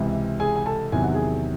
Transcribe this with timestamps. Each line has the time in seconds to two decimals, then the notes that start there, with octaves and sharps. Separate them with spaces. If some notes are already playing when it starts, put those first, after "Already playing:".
Already playing: C#2 C3 E3
0.40 G#4 G#5
0.56 G#5
0.66 A4 A5
0.92 E2 C3 D#3 F#3 G#5
1.04 F#5
1.14 G#4 G#5